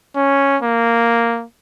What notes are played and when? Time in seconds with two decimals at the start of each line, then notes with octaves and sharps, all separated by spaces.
0.16 C#4
0.62 A#3